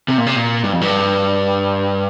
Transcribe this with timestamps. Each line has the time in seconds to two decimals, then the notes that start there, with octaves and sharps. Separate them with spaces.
0.08 C3
0.18 A#2
0.26 C3
0.36 A#2
0.64 G2
0.73 F2
0.81 G2